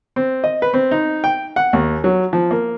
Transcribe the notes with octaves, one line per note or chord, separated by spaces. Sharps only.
C4
D#5
B4
C4
D#4
G5
F#5
D#2
F#3
F3
A#3